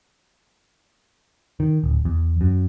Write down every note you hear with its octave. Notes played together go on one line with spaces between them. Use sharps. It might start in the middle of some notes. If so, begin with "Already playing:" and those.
D#3
D1
E2
F#2